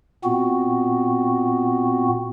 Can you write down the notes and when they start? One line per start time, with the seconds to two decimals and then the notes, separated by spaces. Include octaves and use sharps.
0.24 A#2 B3 C4 F#4